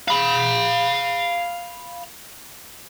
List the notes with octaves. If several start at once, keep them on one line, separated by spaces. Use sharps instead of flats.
F5 B5